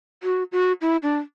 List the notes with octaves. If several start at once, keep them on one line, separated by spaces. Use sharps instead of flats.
F#4
F#4
E4
D4